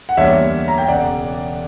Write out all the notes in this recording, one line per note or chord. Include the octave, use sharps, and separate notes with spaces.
F#5
E2 D3 G3 A#3 C#5 E5
A#5
G5
E1 E2 C#3 D5 F#5